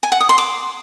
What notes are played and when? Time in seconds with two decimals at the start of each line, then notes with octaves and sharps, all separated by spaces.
0.03 G#5
0.12 F#5
0.20 D#6
0.29 C6
0.38 D6